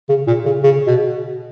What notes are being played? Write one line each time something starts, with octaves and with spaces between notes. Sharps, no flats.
C#3
A#2
C#3
C#3
B2